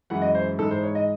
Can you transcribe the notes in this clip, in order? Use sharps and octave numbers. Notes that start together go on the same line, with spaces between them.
F#2 E3 G#3 F#5
D#5
C5
G#2 E3 G#3 A4
C5
C#5
D#5